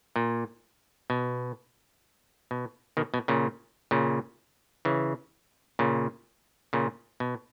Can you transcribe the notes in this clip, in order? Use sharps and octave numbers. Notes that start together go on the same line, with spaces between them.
A#2
B2
B2
B2 D#3
B2
A#2 C#3
A#2 C#3
C#3 E3
A#2 C#3
A#2 C#3
B2